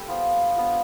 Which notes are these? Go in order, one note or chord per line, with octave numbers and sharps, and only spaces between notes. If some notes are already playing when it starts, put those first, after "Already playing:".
Already playing: G4 A4 B4
F3 B3 F4
F3 B3 D4